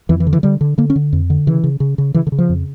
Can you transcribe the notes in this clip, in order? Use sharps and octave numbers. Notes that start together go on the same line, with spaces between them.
F2 E3
E3
D3
E3
D3 G3
D3
D3 A#3
C#4
D3
F2
D3
C#3 E3
C#3
C#3
C#3
C#3 E3
D3
C#3
F3
F2